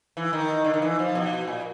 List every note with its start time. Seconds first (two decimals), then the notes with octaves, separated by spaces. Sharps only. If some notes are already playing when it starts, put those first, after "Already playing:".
0.17 E3
0.33 D#3
0.64 D3
0.73 D#3
0.82 E3
0.99 F3
1.15 B2
1.47 A#2